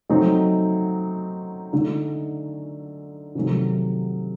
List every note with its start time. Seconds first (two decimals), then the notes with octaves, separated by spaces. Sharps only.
0.09 F#3 A3 C4 D#4
1.73 D3 A3 D#4
3.35 C3 D#3 F#3 A3